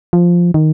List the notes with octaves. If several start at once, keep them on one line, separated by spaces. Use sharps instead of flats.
F3
D#3